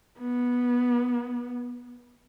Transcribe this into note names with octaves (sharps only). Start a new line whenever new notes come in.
B3